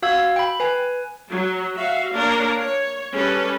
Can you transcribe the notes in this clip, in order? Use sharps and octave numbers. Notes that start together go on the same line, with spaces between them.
F#4 F5 E6 G#6
G5 B5
B4 G#5
F#3
F#4 E5 F5
A#3 D4 A#4 C#5
C#5
G3 C#4 A4 B4